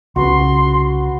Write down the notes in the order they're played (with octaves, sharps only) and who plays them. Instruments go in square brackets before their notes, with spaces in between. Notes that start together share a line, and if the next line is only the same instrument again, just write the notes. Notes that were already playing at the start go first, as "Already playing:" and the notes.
[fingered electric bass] C2 C#3 [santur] F#4 B4 [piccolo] C6